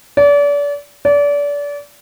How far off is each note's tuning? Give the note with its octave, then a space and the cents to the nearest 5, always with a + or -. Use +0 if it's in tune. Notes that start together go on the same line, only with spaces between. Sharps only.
D5 -35
D5 -30